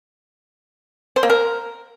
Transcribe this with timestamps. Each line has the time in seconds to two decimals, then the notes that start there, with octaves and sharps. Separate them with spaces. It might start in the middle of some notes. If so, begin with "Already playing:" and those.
1.16 C5
1.23 A#3
1.30 A#4